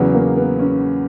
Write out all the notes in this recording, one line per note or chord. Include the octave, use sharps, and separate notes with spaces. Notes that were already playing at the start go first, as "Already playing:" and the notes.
Already playing: E2 C#3 F#3 B3
A#3
B3
C#4